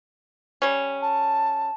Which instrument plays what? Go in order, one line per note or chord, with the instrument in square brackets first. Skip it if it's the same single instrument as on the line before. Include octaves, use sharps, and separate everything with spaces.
[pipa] G3 C#4
[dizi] A5